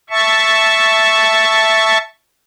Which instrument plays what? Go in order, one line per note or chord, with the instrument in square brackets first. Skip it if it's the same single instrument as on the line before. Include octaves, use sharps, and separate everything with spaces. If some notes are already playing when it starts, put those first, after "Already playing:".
[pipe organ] E5 A5 C#6